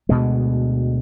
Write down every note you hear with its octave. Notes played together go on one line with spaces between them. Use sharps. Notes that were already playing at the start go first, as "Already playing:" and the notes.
D2 B2 G#3